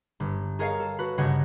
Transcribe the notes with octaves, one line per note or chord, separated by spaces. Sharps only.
G1
G#4 A#4 C#5 D#5 F5
A4
F#4 B4
G1 C#3 D#5 F#5 G#6 A#6